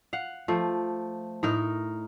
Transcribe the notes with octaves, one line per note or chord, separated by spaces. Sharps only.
F5 F#5
F3 A3
A2 D#4 A#4